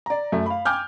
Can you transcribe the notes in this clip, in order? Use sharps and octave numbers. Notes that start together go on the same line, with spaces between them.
D5 A#5
F#2 A3
F5 B5
G5 G#5 D6 F6 G6